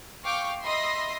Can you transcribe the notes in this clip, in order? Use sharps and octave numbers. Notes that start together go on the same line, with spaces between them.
F5 G5 C#6 D6
D#5 E5 B5 C6 D#6 A#6